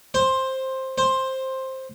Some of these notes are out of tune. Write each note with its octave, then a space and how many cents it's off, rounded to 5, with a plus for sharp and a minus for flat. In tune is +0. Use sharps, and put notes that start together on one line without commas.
C5 +10
C5 +10